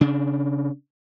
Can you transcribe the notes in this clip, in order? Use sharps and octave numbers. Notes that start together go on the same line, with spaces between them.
C#3 D4